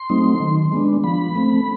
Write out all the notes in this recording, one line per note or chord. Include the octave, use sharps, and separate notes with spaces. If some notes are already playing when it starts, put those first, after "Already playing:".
Already playing: C6
F#3 A3 C4 D#4
D#3
G#3 B3 D4
F3 B5
A3 C4